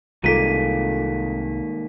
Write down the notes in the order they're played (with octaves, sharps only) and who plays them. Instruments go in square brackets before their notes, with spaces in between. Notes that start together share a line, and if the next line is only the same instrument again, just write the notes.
[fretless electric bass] C2 [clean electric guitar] D#3 G#3 A#3 [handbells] F4 A4 [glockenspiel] B6 D#7